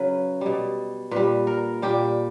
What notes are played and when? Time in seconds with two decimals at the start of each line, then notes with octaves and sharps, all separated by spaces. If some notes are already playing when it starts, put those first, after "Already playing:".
Already playing: C#3 F#3 B4
0.41 B2 G3
1.11 A#2 G3 B4
1.47 A#4
1.82 A#2 G3 G4